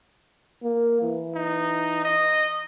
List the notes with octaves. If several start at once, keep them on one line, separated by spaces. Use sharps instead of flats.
A#3
E3
D#4
D#5